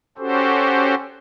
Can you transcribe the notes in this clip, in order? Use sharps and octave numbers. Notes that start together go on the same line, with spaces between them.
C#4 F#4 G4 A4 C5